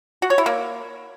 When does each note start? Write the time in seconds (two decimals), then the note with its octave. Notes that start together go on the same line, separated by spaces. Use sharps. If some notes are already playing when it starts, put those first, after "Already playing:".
0.22 F#4
0.30 C#5
0.38 E4
0.46 A#3